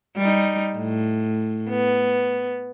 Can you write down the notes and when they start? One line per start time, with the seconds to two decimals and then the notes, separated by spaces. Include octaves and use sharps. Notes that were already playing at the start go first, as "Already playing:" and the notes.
0.17 G3 D#4
0.76 A2
1.69 B3